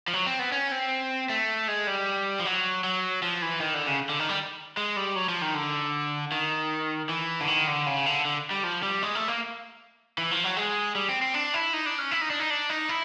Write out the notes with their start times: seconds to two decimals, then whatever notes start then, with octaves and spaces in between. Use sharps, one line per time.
0.08 F3
0.13 F#3
0.26 C4
0.39 B3
0.52 C#4
0.72 C4
1.30 A3
1.68 G#3
1.87 G3
2.40 F3
2.45 F#3
2.84 F#3
3.22 F3
3.42 E3
3.61 D#3
3.74 D3
3.87 C#3
4.10 D3
4.19 D#3
4.29 G3
4.77 G#3
4.97 G3
5.16 F#3
5.29 F3
5.42 D#3
5.54 D3
6.32 D#3
7.09 E3
7.41 D3
7.47 D#3
7.67 D3
7.86 C#3
8.06 D3
8.25 D3
8.51 G3
8.64 F3
8.83 G3
9.03 G#3
9.15 A3
9.28 A#3
10.18 E3
10.31 F3
10.44 F#3
10.57 G#3
10.95 G3
11.09 C4
11.22 C4
11.34 D4
11.54 E4
11.73 D#4
11.86 D4
11.98 C#4
12.11 E4
12.21 D#4
12.30 D4
12.40 D#4
12.50 D4
12.69 D#4
12.89 E4